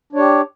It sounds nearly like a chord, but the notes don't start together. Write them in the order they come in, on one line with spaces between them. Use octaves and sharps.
D4 C#5 G4